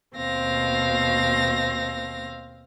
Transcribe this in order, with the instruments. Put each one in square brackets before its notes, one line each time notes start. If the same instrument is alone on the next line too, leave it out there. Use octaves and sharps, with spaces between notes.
[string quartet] D#2 B2 C4 F5 A#6